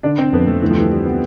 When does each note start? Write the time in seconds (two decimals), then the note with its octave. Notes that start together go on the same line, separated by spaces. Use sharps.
0.03 D3 D4
0.18 D3 C4
0.33 F2 B3
0.47 F2 A3
0.62 D2 E3
0.71 F3
0.76 E3 G3
0.91 G3
1.06 B3